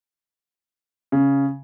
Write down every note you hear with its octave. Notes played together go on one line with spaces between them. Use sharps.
C#3